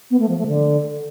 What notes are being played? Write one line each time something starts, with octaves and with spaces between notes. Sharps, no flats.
B3
A3
F3
A3
D3